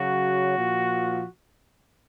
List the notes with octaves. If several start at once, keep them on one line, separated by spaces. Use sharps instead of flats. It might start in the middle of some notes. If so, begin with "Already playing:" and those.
Already playing: C#3 F#3 F#4
A#2 F3